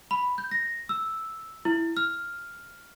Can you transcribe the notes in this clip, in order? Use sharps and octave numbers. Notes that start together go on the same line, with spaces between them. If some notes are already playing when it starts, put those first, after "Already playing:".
B5
G6
A#6
E6
E4
F6